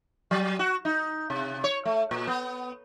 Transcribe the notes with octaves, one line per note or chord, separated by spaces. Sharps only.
F#3
F#4
D#4
C3
C#5
A3
A#2
B3